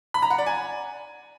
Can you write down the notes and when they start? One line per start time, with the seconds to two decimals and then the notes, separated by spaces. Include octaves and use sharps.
0.14 B5
0.22 A#5
0.30 F#5
0.38 D5
0.46 G#5